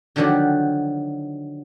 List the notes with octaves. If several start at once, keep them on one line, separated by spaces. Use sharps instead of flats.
D3 D#3 F3 F#3 F#4 G4